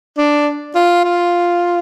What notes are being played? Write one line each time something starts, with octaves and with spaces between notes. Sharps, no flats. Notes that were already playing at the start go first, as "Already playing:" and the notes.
D4
F4
F4